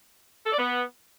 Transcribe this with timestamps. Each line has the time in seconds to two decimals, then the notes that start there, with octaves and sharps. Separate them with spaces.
0.46 A4
0.52 D5
0.59 B3